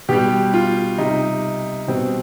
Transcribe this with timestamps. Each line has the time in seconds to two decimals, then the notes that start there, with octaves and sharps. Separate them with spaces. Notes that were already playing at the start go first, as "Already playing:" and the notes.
0.09 B2 G3 G4
0.54 F4
0.98 C3 G3 D#4
1.88 B2 G3 C4